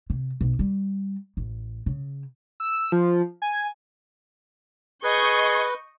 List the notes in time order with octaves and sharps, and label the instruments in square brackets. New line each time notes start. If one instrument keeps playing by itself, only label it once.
[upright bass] C3
B1
G3
A1
C#3
[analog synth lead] E6
F3
G#5
[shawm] G#4 [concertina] B4 [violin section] D#5 C#6 G6